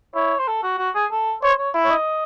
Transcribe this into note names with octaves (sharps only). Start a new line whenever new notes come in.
E4 C#5
C5
A4
F#4
F#4
G#4
A4
C5 C#5
C#5
E4
C#5
D#5